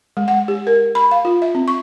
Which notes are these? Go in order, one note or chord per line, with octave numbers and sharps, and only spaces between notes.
G#3
F#5
G4
A#4
B5
F5
F4
E5
C4
C#6